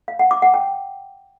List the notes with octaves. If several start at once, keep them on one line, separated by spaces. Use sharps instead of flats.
F5
F#5
D6
F#5
G5